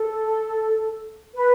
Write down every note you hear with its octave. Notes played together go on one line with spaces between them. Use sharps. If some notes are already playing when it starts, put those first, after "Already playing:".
Already playing: A4
B4